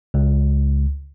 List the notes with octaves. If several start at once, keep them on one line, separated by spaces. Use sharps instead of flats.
C#2